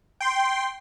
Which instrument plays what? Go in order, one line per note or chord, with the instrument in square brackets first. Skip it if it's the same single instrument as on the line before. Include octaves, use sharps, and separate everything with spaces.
[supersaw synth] G5 C6